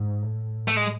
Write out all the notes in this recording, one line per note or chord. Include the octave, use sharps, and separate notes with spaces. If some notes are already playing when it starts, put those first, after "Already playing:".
Already playing: G#2
A2
A3
G#3